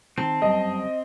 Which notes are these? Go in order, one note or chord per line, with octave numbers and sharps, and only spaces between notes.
D#3 C4 A5
G1 F#2 G3 D#5